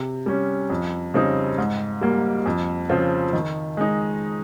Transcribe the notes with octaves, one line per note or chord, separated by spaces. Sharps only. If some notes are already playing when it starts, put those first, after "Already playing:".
Already playing: C3
G3 C#4
F2
C#3 G3 C4 D#4
G#2
G3 A#3
F2
C#3 F3 C4 F4
D#3
G#3 D#4